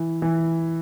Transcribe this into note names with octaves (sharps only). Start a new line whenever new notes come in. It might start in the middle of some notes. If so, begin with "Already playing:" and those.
Already playing: E3
E3